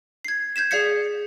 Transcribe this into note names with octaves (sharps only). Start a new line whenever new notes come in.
G#6 C7
G6 G#6 B6 E7
G#4 D5 F5 G#6 B6 C#7